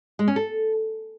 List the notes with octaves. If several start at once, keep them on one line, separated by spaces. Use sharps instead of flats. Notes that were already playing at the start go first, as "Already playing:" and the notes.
G#3
C#4
A4